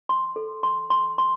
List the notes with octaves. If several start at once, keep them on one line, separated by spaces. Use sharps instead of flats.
C6
A4
C6
C6
C6